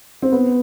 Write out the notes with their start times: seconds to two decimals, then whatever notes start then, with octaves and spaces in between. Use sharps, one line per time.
0.22 C4
0.32 B3